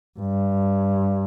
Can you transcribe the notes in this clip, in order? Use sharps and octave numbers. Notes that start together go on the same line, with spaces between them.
G2